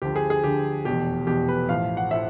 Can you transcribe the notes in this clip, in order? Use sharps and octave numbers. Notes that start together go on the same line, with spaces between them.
D2 D3 F3 G4
G#4
G#4
D2 D3 F3 G4
F1 E2 B2 G4
F1 E2 B2 G4
B4
A1 A2 F3 F5
F#5
A2 F3 E5